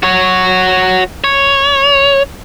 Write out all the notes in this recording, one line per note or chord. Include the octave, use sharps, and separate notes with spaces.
F#4 C#5
C#5